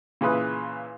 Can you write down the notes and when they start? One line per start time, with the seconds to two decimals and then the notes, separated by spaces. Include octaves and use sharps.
0.21 A#2 C#3 E3 B4 D#6